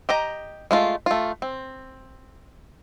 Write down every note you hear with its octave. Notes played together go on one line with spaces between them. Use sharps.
G4 D#5 A#5
G#3 A3 F4
A3 F4
C4